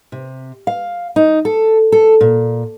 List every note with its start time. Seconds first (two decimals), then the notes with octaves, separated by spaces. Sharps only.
0.12 C3
0.67 F5
1.16 D#4
1.45 A4
1.92 A4
2.21 A#2